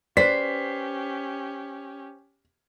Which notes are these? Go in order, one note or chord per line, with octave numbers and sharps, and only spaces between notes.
C#4 G4 B4 C5 D5 B6